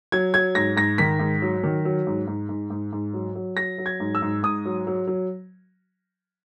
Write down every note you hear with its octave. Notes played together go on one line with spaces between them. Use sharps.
F#3 G#6
F#3 G#6
G#2 A#6
G#2 A#6
D#3 B6
G#2
F#3
D#3
F#3
G#2
G#2
G#2
G#2
G#2
F#3
F#3
F#3 A#6
F#3
G#6
G#2
E6
G#2
G#2 D#6
F#3
F#3
F#3